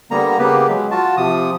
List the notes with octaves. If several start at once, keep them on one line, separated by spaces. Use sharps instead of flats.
D3 G3 A#3 B3 A#5
C#3 A#3 B3 G4 B4
F#3 G#3
F4 F#4 A5
C3 F3 D#6